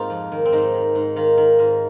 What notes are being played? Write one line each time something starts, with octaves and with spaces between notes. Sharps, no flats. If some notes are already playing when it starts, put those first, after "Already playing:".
Already playing: G#2 A#3 C4 D#4 F4
F2
D#3
C4
G#2 D#4
D#3
G#2
D#3 F4
D#3
G#2